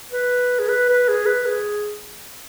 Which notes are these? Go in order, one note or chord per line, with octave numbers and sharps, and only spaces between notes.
B4
G#4
B4
B4
G#4
B4
G#4